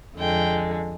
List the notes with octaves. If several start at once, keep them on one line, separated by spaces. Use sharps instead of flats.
F2 D3 G#3 G5